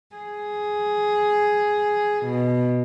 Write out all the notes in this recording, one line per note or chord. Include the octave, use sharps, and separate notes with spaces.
G#4
B2